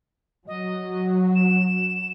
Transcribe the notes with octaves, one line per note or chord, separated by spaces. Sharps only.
F#3 D#5
E7